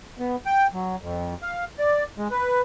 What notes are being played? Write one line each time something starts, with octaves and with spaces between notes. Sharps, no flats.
B3
G5
F#3
F2
F5
D5
G#3
B4